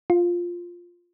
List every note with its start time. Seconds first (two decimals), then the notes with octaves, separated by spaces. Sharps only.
0.10 F4